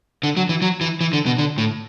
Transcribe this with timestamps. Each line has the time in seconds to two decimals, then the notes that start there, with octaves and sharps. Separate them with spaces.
0.23 D3
0.37 F#3
0.49 E3
0.62 F#3
0.81 E3
1.01 E3
1.13 D3
1.26 B2
1.38 D3
1.58 A2